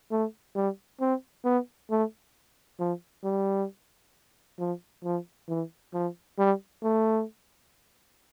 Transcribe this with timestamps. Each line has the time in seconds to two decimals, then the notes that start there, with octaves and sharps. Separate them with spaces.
0.11 A3
0.55 G3
1.01 C4
1.44 B3
1.90 A3
2.80 F3
3.24 G3
4.59 F3
5.04 F3
5.49 E3
5.94 F3
6.39 G3
6.83 A3